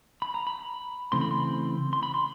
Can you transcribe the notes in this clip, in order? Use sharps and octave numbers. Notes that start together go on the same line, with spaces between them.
B5
A#5
B5
C#3 E3 A3 C4 C6
B5
C6
C6
B5
C6